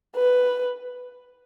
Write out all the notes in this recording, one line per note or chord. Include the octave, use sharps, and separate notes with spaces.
B4